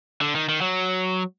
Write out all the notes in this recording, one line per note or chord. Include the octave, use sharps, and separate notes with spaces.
D3
D#3
D#3
F#3